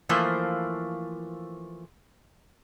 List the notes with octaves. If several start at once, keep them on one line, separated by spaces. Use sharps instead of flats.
E3 F3 A3 A#3 C5